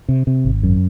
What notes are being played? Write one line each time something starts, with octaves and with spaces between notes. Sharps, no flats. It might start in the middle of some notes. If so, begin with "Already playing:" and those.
C3
C3
G#1
F#2